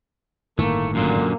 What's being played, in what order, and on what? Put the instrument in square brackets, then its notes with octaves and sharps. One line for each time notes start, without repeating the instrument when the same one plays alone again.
[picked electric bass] G1 A2 D#3 [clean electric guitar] A3 [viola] A#3
[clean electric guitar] F#2 A#2 D3 [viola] A#3